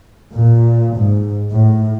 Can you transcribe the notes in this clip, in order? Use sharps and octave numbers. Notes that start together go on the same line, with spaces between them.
A#2
G#2
A2